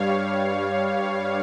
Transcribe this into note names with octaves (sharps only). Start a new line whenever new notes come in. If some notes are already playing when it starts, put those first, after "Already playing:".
Already playing: G2 G3 C#5 F5